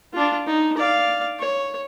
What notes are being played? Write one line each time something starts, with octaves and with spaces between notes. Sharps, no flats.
D4 F4
D#4
D5 F5
C#5